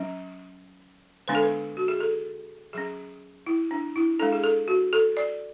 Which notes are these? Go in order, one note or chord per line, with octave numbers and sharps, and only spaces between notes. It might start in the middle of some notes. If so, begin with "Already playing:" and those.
Already playing: F#3 C#4
D3 G#3 B3 D4 B4
A4
B4
F#4
G#4
A4
F#3 C#4 G#4
E4
D4
E4
G#3 D4 A4
G#4
A4
F#4
A4
D5